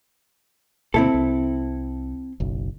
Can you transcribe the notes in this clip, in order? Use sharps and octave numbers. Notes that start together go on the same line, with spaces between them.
D2 B2 A#3 C4 E4 A4
C2
F#1 B1